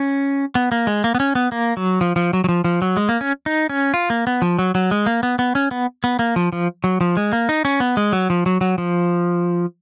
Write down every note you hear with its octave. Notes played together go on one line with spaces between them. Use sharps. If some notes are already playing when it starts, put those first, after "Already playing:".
Already playing: C#4
B3
A#3
G#3
A#3
B3
C#4
B3
A#3
F#3
F3
F3
F#3
F#3
F3
F3
F#3
G#3
A#3
C#4
D#4
C#4
F4
A#3
B3
F3
F#3
F#3
G#3
A#3
B3
B3
C#4
B3
B3
A#3
F3
F3
F#3
F3
G#3
A#3
D#4
C#4
B3
G#3
F#3
F3
F#3
F#3
F3